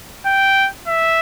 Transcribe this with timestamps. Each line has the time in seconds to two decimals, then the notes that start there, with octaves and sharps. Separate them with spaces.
0.26 G5
0.87 E5